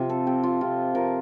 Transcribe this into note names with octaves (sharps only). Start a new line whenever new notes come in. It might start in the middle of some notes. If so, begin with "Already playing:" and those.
Already playing: C3 F3 C4 F4 G4
A4
C4 G4
F4
C3 F4
F3 A#4